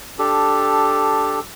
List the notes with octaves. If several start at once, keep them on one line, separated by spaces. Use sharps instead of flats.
D4 G4 A4